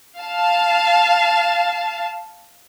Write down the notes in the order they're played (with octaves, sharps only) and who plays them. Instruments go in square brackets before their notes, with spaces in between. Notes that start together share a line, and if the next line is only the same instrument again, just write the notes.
[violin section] F5 A5